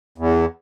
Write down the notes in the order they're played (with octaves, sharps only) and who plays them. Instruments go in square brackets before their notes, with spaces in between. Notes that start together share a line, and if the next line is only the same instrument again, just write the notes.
[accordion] E2